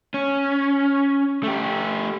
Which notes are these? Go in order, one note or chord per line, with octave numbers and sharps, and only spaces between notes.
C#4
A3 G4